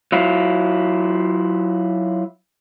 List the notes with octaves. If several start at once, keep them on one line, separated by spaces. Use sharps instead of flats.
F#3 E4 F4